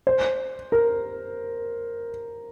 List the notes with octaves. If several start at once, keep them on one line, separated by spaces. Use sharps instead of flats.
C5
A#4